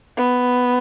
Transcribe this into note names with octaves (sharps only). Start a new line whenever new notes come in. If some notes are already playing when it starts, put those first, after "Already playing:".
B3